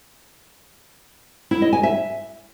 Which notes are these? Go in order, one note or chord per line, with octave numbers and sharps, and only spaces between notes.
E4
D#5
G#5
E5